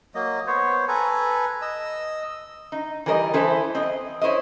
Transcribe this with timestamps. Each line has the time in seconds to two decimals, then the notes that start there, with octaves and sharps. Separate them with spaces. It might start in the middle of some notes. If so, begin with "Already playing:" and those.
0.15 F#3 A#3 D#5
0.47 B3 C5 C#5
0.88 A4 B4 G#5 A#5
1.62 D#5 E6
2.72 D#4
3.06 E3 G3 A#4 C5 D#5
3.34 E3 E4 A4 B4 C5
3.75 C4 D#5
4.21 E4 C5 C#5 D#5